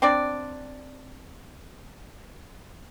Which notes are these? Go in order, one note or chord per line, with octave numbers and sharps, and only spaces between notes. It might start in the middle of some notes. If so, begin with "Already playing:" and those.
C4 D4 D5